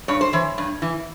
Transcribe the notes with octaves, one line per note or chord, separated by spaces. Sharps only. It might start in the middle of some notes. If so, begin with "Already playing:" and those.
G2 C#5
C5
E3 C#5
G2
E3